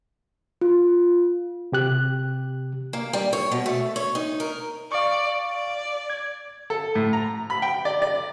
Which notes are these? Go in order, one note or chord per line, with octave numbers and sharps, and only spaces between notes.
F4
C3 G4 F#6
A#3
G3
C#5
B2
A3
C#5
D#4
A#4
D5 F5 C#6
D5
G#6
A4
A2
A#5
B5
G5
D5
D5